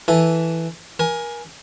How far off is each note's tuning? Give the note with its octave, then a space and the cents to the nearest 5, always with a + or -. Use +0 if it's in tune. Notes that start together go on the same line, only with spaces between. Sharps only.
E3 +0 A4 +0 G#5 +0
A#4 +25 G#5 +0